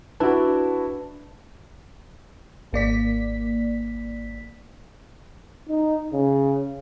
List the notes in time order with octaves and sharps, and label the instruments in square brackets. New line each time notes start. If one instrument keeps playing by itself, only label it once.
[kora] D4 [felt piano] E4 F#4 [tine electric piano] B4 A5
[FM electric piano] G#1 A#3 D5 B6
[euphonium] D#4
C#3